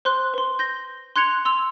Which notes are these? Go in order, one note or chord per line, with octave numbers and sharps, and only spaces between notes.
C5 C6 F#6
B4 C6
G6 A#6 G7
C6 F#6 G#6 C#7 F7
C6 E6 F7